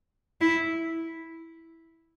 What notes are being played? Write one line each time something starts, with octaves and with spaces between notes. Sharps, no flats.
E4